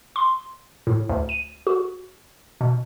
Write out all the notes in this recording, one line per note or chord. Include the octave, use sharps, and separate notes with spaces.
C6
A2
D2
D#7
F#4
B2